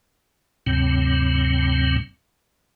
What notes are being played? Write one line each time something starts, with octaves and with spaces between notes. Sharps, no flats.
D2 G2 C3 F#3 C4